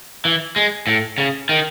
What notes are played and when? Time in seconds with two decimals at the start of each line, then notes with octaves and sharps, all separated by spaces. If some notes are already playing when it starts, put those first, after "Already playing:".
0.25 E3
0.56 G#3
0.87 A2
1.18 C#3
1.49 D#3